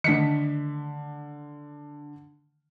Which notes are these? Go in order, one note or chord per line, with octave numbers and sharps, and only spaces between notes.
D3 D#3 A3 B6 C#7